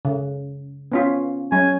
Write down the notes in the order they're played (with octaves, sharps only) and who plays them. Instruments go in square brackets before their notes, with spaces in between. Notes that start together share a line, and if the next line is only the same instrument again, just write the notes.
[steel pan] C#3
B3 C#4 F4
[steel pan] F#3 C#4 [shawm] G#5